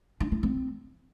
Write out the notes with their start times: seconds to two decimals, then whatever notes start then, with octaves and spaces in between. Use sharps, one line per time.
0.20 D4
0.32 E4
0.43 C4